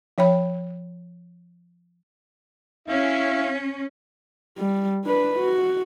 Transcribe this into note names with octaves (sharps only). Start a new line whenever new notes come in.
F3 C#5 G5 B5
C#4 E4 F5
G3
D4 B4
F#4